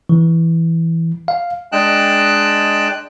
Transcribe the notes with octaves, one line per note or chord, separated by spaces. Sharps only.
E3
F5
G#3 D4 D#5 G5 A5 F#6